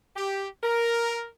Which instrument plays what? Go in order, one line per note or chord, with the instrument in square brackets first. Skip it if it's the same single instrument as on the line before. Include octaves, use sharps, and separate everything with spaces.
[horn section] G4
A#4